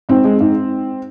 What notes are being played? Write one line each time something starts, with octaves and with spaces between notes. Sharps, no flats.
G#2 C4
G#3
G#2